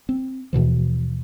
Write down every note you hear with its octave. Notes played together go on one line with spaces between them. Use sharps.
C4
D#2 B2 E3 F3